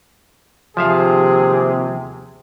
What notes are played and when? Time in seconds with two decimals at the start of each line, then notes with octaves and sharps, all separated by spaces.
0.77 D#2 C3 F3 G#4 E5 F5